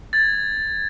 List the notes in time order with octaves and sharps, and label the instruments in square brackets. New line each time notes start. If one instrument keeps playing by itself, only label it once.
[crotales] G#6 A6